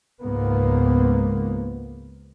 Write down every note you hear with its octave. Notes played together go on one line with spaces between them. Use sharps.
C#2 G#2 A#3 B3